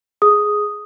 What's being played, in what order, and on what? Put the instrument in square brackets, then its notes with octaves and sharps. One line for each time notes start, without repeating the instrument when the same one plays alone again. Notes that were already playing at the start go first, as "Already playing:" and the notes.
[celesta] G#4 D#6